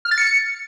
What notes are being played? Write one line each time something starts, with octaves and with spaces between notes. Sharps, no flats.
F6
A6
C#7